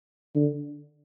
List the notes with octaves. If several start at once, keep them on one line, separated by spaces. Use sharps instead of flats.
D3